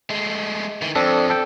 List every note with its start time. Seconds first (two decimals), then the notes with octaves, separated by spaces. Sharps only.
0.10 G#3 A3
0.82 D#3 E3
0.95 F2 C4 D4 A4
1.30 A4 G5